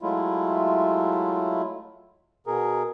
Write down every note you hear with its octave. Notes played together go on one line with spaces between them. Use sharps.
F#3 G#3 A3 E4 F4
B2 G#4 A#4